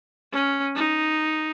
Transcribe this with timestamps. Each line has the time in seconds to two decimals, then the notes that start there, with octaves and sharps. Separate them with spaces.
0.33 C#4
0.76 D#4